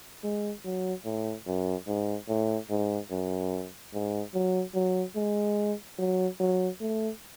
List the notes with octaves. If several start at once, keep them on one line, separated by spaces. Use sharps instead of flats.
G#3
F#3
A2
F#2
G#2
A2
G#2
F#2
G#2
F#3
F#3
G#3
F#3
F#3
A3